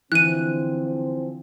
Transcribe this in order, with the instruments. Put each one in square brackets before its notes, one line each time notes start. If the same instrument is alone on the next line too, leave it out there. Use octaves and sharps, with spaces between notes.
[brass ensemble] D3 F3 C4 [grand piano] E3 [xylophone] F#6 D#7